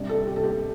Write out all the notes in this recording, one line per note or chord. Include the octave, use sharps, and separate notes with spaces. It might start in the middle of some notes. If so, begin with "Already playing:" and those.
Already playing: C3 G3 D4
A4
G4
A4
G4